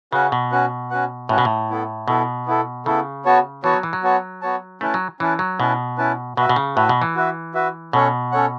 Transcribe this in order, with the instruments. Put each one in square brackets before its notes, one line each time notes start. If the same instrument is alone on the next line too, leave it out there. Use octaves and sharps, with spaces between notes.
[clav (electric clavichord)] C#3 [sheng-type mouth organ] C#4 F#4 B4 F#5
[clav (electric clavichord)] B2
[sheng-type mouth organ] C#4 F#4 B4 F#5
C#4 F#4 B4 F#5
[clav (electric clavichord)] A2 [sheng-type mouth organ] C#4 F#4 B4 F#5
[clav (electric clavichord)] B2
A2
[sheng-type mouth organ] B3 E4 A4
[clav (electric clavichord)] B2 [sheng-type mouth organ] B3 E4 A4
[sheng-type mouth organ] B3 E4 A4
[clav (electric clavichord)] C#3 [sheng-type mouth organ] B3 E4 A4
[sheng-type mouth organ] B3 F#4 C#5 A5
[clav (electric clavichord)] E3 [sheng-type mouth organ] B3 F#4 C#5 A5
[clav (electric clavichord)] F#3
E3
F#3
[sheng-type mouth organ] B3 F#4 C#5 A5
B3 F#4 C#5 A5
[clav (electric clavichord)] A3 [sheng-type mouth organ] C#4 E4 B4 A5
[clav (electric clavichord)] F#3
[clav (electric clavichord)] E3 [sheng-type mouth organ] C#4 E4 B4 A5
[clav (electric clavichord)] F#3
[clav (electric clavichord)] B2 [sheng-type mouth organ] C#4 E4 B4 A5
[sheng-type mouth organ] C#4 E4 B4 A5
[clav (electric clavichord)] B2 [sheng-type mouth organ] F#4 B4 E5
[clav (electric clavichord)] B2
C#3
[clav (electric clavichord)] A2 [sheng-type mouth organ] F#4 B4 E5
[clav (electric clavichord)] B2
E3
[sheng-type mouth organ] F#4 B4 E5
F#4 B4 E5
[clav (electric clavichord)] B2 [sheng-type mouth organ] C#4 A4 C#5 F#5
[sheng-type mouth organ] C#4 A4 C#5 F#5